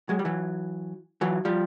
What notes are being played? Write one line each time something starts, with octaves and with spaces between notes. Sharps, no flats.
F#3 G#3
G3
E3 F#3
E3 F#3
F3 G3